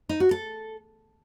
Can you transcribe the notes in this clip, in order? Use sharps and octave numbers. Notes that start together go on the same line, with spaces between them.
D#4
F#4
A4